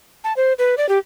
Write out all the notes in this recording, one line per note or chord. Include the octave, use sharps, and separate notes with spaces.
A5
C5
B4
D5
G4